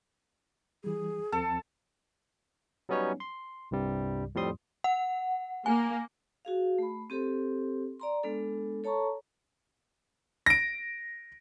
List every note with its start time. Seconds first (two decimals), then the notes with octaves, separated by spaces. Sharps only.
0.84 E3 G3 G#4
1.32 D#2 F3 C4 A4
2.89 F#3 G3 B3 C#4 D#4 C#5
3.20 C6
3.71 C2 G2 C3 G3
4.35 F2 A2 G3 C4 C6 D#6
4.84 F#5
5.66 A#3 G#5
6.45 F#4 G#4 F5
6.79 A3 B5
7.10 C4 G4 A4 C5 C6
8.00 D5 A#5 C6
8.23 G#3 B3 D4 A4
8.84 A4 C#5 A5 A#5 C#6
10.46 A#6 D7